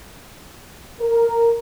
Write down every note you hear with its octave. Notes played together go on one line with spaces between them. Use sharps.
A#4